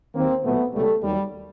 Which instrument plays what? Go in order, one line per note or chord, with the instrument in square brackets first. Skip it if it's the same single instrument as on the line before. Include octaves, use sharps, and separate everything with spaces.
[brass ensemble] D#2 D#3 F#3 A#3 C4
B1 A#2 F#3 A3 B3
C#2 B2 F#3 G3 A3
D#2 D#3 F#3 G3